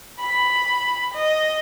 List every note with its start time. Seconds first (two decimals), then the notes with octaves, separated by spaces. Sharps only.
0.20 B5
1.14 D#5